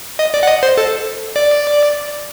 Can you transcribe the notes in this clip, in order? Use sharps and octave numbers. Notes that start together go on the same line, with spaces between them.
D#5
D5
F#5
D#5
C5
A4
D5